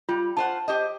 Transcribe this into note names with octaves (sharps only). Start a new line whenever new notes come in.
G3 F4
F4 C5 F#5 A5
G4 C5 D#5